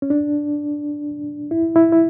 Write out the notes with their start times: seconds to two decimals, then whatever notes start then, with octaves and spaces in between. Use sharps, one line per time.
0.02 C#4
0.10 D4
1.51 E4
1.76 E4
1.92 E4